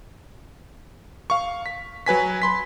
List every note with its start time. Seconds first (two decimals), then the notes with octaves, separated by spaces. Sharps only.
1.30 F5 C#6
1.66 B6
2.06 F#3 B4 G#5 B6
2.42 B5 C6 B6